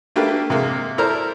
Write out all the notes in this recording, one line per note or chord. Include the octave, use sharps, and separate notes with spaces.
A3 A#3 D4 G4 B4
C3 G#3 A#3
E4 A4 A#4 C5 D5 A#5